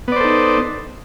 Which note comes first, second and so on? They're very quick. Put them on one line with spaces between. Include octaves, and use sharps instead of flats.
B3 D5 C5 A4 D#4